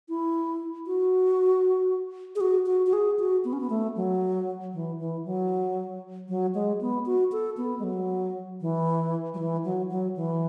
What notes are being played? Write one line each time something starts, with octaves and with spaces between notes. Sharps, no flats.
E4
F#4
G#4
F#4
F#4
F#4
G#4
F#4
B3
C#4
B3
A3
F#3
E3
E3
F#3
F#3
G#3
B3
F#4
A4
B3
G#3
F#3
E3
F#3
E3
F#3
F#3
E3